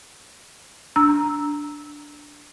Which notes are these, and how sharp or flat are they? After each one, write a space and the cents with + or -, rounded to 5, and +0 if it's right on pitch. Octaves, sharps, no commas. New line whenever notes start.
D4 +0 A#5 +0 E6 -15